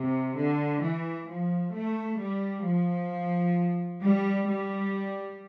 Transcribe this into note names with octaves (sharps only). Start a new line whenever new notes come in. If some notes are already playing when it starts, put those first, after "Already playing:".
Already playing: C3
D3
E3
F3
A3
G3
F3
G3
G3